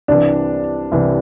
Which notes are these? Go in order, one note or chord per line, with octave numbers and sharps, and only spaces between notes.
C2 C3 E3 D4
C2 C3 E3